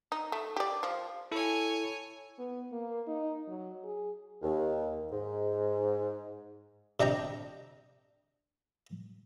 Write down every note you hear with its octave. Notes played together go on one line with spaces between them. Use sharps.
D#4
A3
G4 D5
F3
E4 A4 C#5 G#5
B3
A#3
D#4
F#3
G#4
D#2
G#2
C3 D4 D#5 G5 A#5